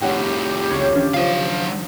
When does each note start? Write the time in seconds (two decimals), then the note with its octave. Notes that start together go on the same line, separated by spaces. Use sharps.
0.01 F2 A2 G4 C#5 F#5 G5
0.69 C#2 C#5
0.95 D#3 F3 C#4 D4
1.14 F#3 F4 C5 F5